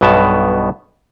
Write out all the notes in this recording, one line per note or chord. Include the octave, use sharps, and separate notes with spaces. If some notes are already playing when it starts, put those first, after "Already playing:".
B1 G2 B2 B3 A5